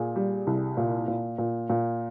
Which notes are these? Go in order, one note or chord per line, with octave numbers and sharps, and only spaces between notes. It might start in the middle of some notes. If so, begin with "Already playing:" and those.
Already playing: A#2 G#4
G3
C2
A#2
A#2
A#2
A#2